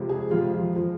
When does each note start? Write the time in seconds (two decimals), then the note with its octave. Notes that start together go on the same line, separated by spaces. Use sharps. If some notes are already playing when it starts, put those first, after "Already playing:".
Already playing: F2 C3 F3 G#3
0.09 G#4
0.30 F2 C3 F3 G#3 F4
0.52 F4
0.75 F3 G#3